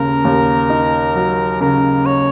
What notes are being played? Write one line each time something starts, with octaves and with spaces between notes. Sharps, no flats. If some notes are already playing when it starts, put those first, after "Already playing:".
Already playing: D#2 C#3 A#3 A#4
D#2
D#4
F#3
C#3 A#4
C#5